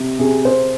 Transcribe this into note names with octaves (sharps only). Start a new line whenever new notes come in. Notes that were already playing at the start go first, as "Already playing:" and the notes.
Already playing: C3
C3 G#4
C3 C5